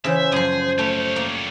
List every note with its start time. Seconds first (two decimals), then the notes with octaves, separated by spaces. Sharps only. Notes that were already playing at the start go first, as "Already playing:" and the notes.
0.04 C#3 E3 C5 E5
0.32 F#2 F3 G#4
0.79 G3 A3 C#5
1.16 A#3